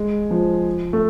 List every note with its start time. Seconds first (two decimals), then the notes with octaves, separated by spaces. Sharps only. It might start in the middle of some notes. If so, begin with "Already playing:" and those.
Already playing: G#3
0.31 F3
0.93 A3